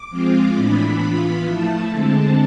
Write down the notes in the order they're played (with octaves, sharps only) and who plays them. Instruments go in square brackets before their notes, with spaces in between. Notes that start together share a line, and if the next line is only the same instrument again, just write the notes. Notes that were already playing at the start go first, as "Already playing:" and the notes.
Already playing: [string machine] D6
F3 G#3 C4 F4
A2 E3 B3 D4 B5
E3 B3 F4
F3 A3 E4 A5
D3 G#3 C4